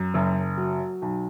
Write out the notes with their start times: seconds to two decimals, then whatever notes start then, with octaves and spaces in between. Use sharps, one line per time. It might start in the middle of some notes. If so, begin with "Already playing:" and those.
Already playing: F#2
0.14 F#1
0.57 F#3
1.02 B1